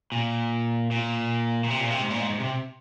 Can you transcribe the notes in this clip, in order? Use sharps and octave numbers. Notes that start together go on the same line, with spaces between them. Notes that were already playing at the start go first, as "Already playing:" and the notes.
A#2
A#2
A#2
C3
A#2
C3
G#2
A#2
G#2
G#2
C3